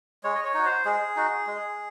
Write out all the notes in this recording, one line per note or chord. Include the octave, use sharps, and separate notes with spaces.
G#3 C#5
D#5
C#5
D#4 F#4
C5
G#3 G#4
D#4 F#4
G#3